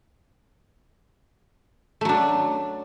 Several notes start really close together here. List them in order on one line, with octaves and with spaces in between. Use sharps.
A3 F#3 D4